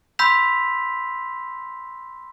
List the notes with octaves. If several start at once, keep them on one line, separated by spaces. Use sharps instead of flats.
B5 C6 E6 G6 B6 F7